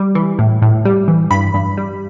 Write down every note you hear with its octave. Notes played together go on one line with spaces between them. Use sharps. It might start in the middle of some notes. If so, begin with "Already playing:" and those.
Already playing: G3
E3
A2
A2
G3
E3
G2 B5
G2
G3